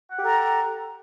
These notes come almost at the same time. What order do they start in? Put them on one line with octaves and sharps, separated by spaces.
F#5 G4 A4 A#5